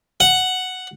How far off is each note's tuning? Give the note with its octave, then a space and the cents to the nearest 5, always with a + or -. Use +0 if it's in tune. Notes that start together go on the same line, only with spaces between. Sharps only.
F#5 +0